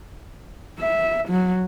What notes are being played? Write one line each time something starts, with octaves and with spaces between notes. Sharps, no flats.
E5
F#3